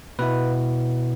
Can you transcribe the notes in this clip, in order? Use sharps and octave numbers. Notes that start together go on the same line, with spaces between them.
B2 B3 E4 B4